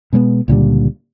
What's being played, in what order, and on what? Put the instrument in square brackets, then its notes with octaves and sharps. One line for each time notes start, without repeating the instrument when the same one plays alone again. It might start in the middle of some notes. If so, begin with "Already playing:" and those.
[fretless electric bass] B2 G#3 A#3 B3
C#2 A#2 D3 G3